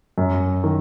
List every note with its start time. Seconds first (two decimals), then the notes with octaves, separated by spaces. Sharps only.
0.18 F#2
0.64 D#3